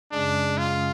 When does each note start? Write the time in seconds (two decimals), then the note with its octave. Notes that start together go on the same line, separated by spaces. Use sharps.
0.12 F#2 C#3 G#3 C#4 D4 G#4
0.58 F4